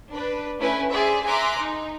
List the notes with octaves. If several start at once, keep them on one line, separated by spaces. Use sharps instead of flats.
D4 B4
A3 C#4 E4 B4 G#5
G#4 C5 D5 E5
E5 G#5 A#5 C6 D6 F#6
D#4